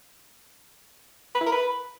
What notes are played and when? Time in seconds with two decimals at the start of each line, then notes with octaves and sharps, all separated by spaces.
1.35 B4
1.41 E4
1.46 A#4
1.52 B4